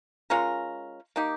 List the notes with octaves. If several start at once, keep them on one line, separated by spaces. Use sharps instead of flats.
G#3 C#4 F4 A#4
A#3 D#4 G4